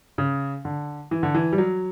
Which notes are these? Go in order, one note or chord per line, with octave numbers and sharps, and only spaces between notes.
C#3
D3
E3
D3
E3
G3
F#3